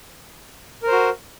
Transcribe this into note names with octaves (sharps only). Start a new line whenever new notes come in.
F#4 A#4 C5